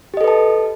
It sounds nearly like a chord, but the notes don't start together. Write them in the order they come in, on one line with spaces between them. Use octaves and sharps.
G4 D#5 A4 B4 A5